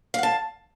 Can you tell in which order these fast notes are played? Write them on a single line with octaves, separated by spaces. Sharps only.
F5 F#5 A5